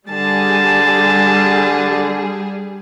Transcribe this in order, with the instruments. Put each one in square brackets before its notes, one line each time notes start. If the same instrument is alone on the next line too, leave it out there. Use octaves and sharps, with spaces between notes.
[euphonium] D3 [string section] G3 G#4 [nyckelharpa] A5